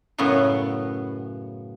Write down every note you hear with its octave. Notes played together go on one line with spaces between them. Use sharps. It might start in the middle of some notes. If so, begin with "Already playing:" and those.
F#2 A2 C#3 B3